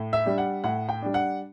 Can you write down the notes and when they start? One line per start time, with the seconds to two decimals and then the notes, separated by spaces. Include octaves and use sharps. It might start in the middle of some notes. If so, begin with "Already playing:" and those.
Already playing: A2
0.13 E5
0.25 G3 D4
0.38 F#5
0.64 A2 F#5
0.89 G5
1.02 G3 D4
1.14 F#5